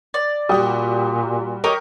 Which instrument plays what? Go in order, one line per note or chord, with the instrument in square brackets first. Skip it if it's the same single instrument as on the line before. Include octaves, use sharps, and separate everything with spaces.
[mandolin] D5
[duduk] A#2 [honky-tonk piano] G3 F#4 G4 [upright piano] G5 D#6
[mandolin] G4 C#5 D#5 [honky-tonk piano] A#4